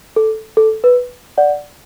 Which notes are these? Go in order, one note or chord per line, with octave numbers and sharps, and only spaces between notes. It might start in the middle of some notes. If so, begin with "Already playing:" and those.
A4
A4
B4
D5 F#5